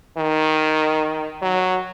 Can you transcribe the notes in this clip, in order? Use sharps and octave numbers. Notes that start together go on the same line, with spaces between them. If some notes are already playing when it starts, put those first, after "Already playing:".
D#3
F#3